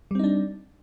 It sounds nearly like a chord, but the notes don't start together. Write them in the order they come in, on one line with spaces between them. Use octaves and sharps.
G3 C4 D#4 D4